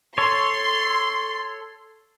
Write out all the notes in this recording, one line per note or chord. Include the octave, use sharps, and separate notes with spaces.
A4 C#5 C6